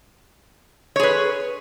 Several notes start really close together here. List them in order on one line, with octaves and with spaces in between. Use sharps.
C#5 G#4 B4